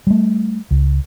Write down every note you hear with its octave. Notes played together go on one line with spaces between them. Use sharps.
G3 A3
C#2